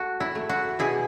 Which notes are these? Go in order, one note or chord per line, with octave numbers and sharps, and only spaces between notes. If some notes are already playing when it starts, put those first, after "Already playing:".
Already playing: A3 F#4
E4
A3
F#4
B2 E4 G#4